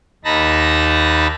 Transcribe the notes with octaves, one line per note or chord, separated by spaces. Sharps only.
D#2 D#4 A5 B5 A#6